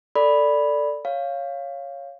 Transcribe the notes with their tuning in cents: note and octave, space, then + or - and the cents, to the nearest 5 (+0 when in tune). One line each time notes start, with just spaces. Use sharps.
A4 +15 D5 +0 B5 +0
C#5 +0 F5 +0